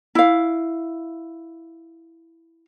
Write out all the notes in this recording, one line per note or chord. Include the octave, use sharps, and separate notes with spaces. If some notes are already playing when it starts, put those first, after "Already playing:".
E4 F5